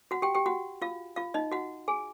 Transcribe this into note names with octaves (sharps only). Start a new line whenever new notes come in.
F#4 F#5
G4 G5
G4 G5
F#4 F#5
F4 F5
F4 F5
D#4 D#5
F#4 F#5
G#4 G#5